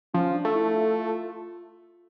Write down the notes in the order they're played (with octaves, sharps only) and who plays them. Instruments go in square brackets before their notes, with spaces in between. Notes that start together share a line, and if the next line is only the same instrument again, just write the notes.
[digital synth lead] F3 [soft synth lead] C#4
[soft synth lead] D4
[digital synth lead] A3
[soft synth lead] E4
F4